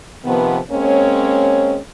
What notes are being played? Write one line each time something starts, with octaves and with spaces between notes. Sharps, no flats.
C3 D#3 F3 B3
G#3 A#3 C4 C#4 C#5